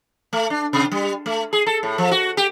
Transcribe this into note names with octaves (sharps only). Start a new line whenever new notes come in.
A3
D4
C3
G3
A3
G#4
A4
A2
F3
F#4
G4